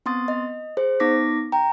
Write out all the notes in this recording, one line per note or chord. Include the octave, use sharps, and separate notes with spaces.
B3 C4 C6 D#6 A6
D#5
G#4 C5
B3 D#4 D6 A#6 B6
G5 A#5